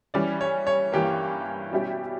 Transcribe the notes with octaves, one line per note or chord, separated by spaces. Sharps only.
E3 G3 C#4 D5
C#5
C#5
G2 E3 A#3 G4
B2 G3 C#4 E4 G4